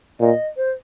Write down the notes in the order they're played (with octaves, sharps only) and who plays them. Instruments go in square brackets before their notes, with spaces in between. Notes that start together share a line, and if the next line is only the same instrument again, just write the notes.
[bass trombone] A#2 [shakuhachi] D#5
[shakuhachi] C5